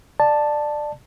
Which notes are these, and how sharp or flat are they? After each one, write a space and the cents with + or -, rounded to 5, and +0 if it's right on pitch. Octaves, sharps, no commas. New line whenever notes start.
D5 +20 A5 +0